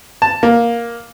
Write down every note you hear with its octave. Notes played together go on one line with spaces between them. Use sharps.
A5
A#3